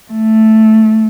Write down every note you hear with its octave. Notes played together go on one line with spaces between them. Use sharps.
A3